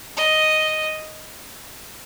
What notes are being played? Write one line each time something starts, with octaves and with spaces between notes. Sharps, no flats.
D#5